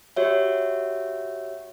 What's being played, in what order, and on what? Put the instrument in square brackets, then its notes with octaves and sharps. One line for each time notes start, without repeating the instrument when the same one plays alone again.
[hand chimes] F#4 G4 C#5 E5